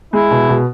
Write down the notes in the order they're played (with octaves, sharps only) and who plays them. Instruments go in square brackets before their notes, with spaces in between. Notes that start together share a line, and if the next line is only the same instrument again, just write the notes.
[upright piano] G#3 [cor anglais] E4
[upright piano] B2
B2